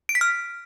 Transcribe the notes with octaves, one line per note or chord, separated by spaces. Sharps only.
D7
B6
F6